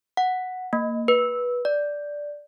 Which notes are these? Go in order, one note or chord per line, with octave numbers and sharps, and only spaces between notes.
F#5
A#3
B4
D5